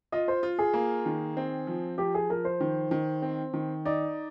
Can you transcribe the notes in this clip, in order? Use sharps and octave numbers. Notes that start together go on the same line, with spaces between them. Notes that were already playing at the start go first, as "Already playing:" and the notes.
F4 D#5
C5
F4
G#4
A#3
D#3
C4
F3
F3 G4
G#4
F3 A#4
C5
D#3
D#3
C4
D#3
D#4 D5